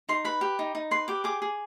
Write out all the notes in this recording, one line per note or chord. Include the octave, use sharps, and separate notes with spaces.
D#4 C6
B4 B5
G4
D#4
D#4
B4 C6
G4 D6
G#4 D6
G#4